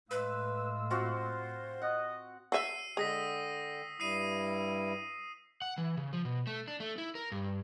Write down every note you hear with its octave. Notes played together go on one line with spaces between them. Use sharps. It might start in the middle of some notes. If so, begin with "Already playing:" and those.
A2 G#3 B4 F5 E6
C4 F4 F#4 C5
D#5 F#5
F#4 E5 E6 C7 D#7
D3 G#3 G5 D#6 A#6 B6
G2 G3 E4 D#6 C7 D#7
F#5
E3
C#3
F3
B2
A3
D4
A3
E4
A#4
G2